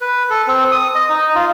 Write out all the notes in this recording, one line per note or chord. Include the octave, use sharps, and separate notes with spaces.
B4
A4
C4
D#6
D#5
D#4
F4